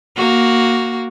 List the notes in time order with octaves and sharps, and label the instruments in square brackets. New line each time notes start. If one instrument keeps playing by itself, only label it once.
[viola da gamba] A#3 F#4